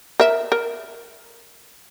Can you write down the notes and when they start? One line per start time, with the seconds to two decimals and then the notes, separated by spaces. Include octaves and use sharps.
0.20 A#4 E5
0.52 A#4